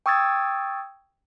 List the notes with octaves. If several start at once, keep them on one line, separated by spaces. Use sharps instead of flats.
G5 C#6 D#6 E6 G#6 A6